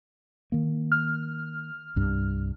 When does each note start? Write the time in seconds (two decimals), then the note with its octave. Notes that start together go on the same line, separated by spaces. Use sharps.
0.52 D#3 A#3
0.92 F6
1.96 C2 G2